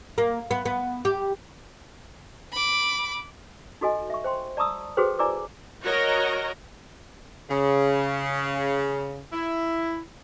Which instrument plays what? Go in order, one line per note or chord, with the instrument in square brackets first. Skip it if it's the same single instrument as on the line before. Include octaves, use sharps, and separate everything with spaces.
[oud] A#3
B3
B3
G4
[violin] B5 D6
[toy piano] D#4 F#4 A4 D#5 G#5
E5 C#6
C5 G5 C6
D5 A5 A#5 C#6 D#6 E6
F#4 G#4 A4 B4 C5 G5
E4 D5 G#5 A#5 D6 E6
[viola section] F#4 A#4 C#5 D#5 A#5
[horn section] C#3
E4